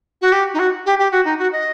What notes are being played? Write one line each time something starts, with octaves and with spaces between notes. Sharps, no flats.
F#4
G4
D#4
F#4
G4
G4
F#4
D#4
F#4
D#5